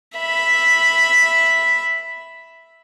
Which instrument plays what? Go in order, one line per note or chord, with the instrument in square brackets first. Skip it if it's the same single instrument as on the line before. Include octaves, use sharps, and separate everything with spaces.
[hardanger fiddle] E5 B5